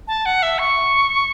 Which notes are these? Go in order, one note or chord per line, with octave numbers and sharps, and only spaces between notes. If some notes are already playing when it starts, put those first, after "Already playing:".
A5
F#5
E5
C#6